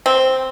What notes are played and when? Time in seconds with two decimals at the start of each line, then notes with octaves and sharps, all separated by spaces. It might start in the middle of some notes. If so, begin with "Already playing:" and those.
0.06 C4